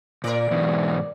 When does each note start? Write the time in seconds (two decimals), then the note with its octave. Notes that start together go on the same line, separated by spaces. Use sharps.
0.24 A#2 A#4 D5
0.50 G#2 B2 E3